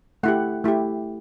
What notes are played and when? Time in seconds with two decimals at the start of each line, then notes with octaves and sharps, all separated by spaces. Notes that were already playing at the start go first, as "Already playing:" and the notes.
0.23 A3 E4 G4 F#5
0.64 A3 E4 G4